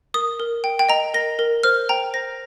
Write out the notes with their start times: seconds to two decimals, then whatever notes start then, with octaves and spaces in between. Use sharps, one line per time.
0.14 A#4 D#6
0.40 A#4
0.64 G5
0.79 G5
0.89 D#5 A#5
1.14 A#4 A#6
1.39 A#4
1.63 C5 F6
1.89 G5 A#5
2.14 C5 A#6